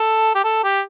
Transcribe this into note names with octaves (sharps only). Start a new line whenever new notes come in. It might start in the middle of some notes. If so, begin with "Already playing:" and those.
Already playing: A4
G4
A4
G4